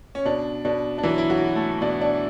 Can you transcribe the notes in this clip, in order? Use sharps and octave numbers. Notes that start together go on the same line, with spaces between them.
C#4
B2 D4
B2 D4
D4
E3 F#3 E4
E4
F#3 F#4
F#3
A3 A4
B2 D4 D5
D4 D5